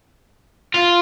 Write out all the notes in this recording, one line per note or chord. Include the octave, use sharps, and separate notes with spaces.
F4